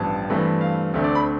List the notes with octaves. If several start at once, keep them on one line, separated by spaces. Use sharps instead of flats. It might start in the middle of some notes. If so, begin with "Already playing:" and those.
Already playing: A1 G2 F3 B3 A5
G2 E3 A3 C4
F5
D2 D3 A3 C4 E5
D5
B5